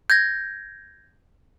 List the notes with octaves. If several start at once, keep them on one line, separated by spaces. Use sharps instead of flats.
G6 G#6 A#6